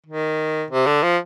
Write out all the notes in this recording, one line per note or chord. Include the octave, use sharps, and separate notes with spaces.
D#3
C3
D3
F3